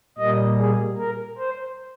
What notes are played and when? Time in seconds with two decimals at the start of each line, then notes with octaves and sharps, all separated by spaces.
0.18 A#2 G3 A#3 D#5
0.58 G#4
0.98 A#4
1.38 C5